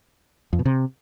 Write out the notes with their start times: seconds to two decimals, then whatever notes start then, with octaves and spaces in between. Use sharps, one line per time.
0.53 F2
0.59 B2
0.65 C3